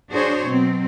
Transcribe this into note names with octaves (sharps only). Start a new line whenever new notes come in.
D4 F#4 G#4 C5 C#5
B2 F#3 C4